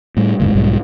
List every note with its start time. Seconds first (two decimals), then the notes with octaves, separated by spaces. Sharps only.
0.17 A2 G3
0.40 F#1 D2 G#2
0.55 B1 G#2 G3